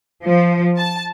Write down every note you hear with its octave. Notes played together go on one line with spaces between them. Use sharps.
F3
A5